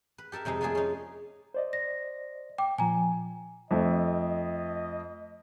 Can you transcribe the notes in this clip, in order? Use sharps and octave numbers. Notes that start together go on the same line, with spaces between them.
B4
G4 A4 A#4 E5
F2 C3 G#3 D#4
A3 A#3 D4 F4 G#4
C#4 D#4
C5 D5 D#5
A#6
G5 D6
A#2 F3 G#5 A#5
F2 A3 D#5